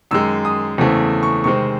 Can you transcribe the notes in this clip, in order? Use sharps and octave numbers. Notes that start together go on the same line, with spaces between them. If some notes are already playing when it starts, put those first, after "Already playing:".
F#2 D#3 G#3 E6
D#6
E2 C#3 E3 A3 C4
C#6
C3 D#3 G#3 C4 C#6